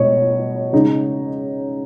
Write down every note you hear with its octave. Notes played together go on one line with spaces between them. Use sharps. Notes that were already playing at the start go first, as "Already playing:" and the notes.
Already playing: B2 C#5 D#5
C#3 G#3 D#4